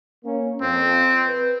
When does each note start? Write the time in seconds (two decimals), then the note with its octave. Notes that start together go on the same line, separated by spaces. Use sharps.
0.25 A#3 C#4
0.62 F2 C4
1.26 B4